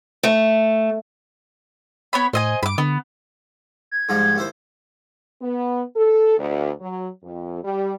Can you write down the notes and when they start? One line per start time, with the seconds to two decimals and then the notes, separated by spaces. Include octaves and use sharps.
0.23 A3
2.13 B3 C#5 B5
2.33 A2 C5 D#5 G#5
2.63 G2 B5 D6
2.78 D3 B3
3.91 G#6
4.09 G#2 F3 G3
4.36 D#2 E4 C5
5.41 B3
5.96 A4
6.38 D2
6.81 F#3
7.24 F2
7.63 G3